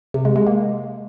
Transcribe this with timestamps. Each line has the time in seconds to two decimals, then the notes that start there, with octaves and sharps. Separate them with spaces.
0.14 C3
0.25 G#3
0.36 G#3
0.47 A#3